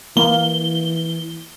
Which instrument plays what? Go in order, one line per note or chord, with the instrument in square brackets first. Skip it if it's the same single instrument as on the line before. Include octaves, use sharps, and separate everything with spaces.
[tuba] E3 [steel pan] A#3 [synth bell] G7